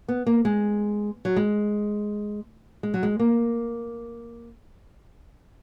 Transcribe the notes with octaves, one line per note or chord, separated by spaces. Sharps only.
B3
A#3
G#3
F#3
G#3
G#3
F#3
G#3
A#3